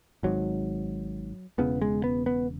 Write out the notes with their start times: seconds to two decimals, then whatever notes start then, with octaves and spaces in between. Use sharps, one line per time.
0.23 G#1 G#2 F#3
1.58 E1 E2 C#3 B3
1.82 G#3
2.04 B3
2.26 B3